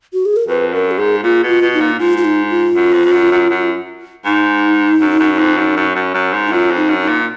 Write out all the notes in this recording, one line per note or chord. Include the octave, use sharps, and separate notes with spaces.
F#4
G#4
A#4
F2 B4
F#2 A#4
F#4
G#2 G#4
A#2 F4
B2
F4
B2
D#4
A#2
G#2 F4
F4
D#4
F4
F#2
F2
F2
F#2
F#2
F#2
G#2 D#4
F#2
F#2
F2
F#2
F#2
F#2
F#2
G#2
D#4
F#2 F4
F2
D#4
F#2
D#4
A#2